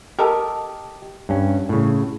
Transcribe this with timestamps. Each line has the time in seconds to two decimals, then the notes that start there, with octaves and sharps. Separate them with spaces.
0.19 G4 A4 A#4 D#5
1.29 G2 C#4
1.69 A2 C#3